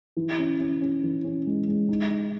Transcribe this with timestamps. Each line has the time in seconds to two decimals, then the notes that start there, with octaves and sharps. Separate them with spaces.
0.17 E3
0.39 C#4
0.60 C#4
0.81 C#4
1.03 E3
1.24 C#4
1.46 G#3
1.68 G#3
1.89 D#4
2.10 D#4